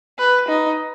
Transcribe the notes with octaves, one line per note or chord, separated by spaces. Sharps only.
B4
D#4